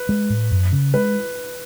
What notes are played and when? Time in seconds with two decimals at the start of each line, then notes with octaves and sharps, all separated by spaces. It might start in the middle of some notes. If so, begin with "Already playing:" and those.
Already playing: B4
0.09 G#3
0.30 A2
0.51 F#2
0.72 C#3
0.94 G#3 B4